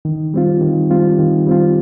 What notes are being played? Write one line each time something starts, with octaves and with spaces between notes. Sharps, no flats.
D#3
G3 C4 F4
D#3
G3 C4 F4
D#3
G3 C4 F4